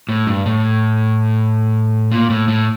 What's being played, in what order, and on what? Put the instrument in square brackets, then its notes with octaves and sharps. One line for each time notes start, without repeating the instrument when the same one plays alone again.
[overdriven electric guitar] A2
G2
A2
A#2
A2
A2